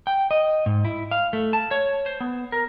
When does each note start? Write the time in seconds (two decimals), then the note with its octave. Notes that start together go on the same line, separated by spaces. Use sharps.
0.07 G5
0.31 D#5
0.66 G#2
0.85 E4
1.11 F5
1.33 A3
1.53 A5
1.71 C#5
2.06 C5
2.20 B3
2.52 A#4